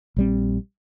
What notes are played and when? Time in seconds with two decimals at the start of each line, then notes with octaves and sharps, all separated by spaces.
0.16 A#1 G3 C4